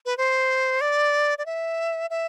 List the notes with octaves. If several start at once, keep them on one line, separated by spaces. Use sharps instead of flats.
B4
C5
D5
D5
E5
E5